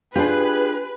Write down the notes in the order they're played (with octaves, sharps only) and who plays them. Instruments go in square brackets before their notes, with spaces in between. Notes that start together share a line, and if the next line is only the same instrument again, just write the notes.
[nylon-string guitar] D4 F4 [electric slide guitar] G4 G#4 [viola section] B4